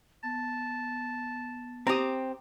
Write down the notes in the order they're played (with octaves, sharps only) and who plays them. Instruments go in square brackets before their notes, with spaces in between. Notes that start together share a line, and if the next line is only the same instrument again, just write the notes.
[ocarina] B3 [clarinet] A5
[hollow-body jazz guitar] C4 G4 [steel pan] A#5 D#6